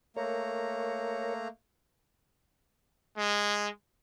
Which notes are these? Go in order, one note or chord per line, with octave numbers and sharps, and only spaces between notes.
A3 A#3 A#4 C#5 A#5
G#3